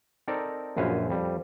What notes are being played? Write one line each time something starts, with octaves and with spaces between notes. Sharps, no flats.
C4 D#4 A4 A#4 D5
A#1 F#2 B4 C5 F5 G#5
F2 G3